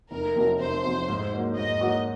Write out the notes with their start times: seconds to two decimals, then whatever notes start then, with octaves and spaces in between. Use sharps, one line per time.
0.11 F1 A#4
0.36 F2 C3 F#3
0.60 F1 C5
0.83 F2 C3 F#3
1.08 G#2
1.32 F#3 A#3 D#4 F#4
1.57 G#2 D#5
1.81 F#3 A#3 D#4 F#4